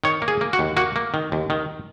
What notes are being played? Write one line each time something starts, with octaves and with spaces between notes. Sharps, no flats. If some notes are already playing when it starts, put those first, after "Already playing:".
D#3 C#5
A#3
G#4
A#3
F#4
D#2
A#3 F#4
A#3
D#3
D#2
D#3